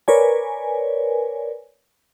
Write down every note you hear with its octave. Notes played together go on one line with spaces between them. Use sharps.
A#4 B4 C#5 D5 G#5